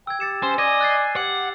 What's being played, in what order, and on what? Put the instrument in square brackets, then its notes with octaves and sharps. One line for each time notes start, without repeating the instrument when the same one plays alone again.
[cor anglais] G5 [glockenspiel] E6 G#6
[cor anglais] G4 [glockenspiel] A6 C#7 E7
[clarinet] C#4 [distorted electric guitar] C5
[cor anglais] D5 [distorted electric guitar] D#5 [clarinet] G#5
[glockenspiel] F#6 A6 C7
[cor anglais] G4 [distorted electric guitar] F#5